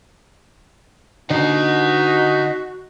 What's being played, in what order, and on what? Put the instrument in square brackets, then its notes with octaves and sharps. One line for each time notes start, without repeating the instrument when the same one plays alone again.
[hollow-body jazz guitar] D3 [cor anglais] D#4 [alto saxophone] F#4 [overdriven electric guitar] D#5 F#5